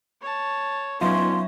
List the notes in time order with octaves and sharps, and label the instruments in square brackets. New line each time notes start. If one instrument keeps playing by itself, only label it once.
[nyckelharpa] C#5 A5
[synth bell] F#3 E5 F5 [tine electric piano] B3 D#4 F4 [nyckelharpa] C#4 [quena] C6